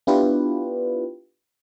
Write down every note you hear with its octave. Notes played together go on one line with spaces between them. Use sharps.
B3 D4 E4 F4 G4 B4